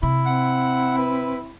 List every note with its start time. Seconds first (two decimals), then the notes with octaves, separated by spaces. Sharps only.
0.03 C3 E4
0.26 C4 F#5
0.98 B4